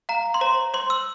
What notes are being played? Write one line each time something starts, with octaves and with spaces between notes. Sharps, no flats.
F5 A#5
C6
C5 A#5
C5 C6
E6